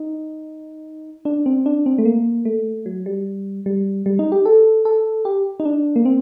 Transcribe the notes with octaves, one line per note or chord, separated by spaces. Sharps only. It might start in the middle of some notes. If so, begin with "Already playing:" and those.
Already playing: D#4
D4
C4
D4
C4
A3
A#3
A3
F#3
G3
G3
G3
D#4
G4
A4
A4
G4
D#4
D4
A#3
C4